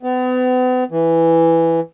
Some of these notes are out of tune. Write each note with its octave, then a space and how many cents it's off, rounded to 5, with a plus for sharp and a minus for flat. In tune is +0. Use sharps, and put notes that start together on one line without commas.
B3 +40
E3 +5